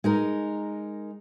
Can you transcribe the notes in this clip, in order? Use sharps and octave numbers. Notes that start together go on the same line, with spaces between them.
G#3 D#4 A#4